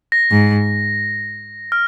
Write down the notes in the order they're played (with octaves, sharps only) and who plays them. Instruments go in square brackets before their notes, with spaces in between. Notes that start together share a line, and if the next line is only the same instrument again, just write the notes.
[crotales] A#6
[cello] G#2
[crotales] F6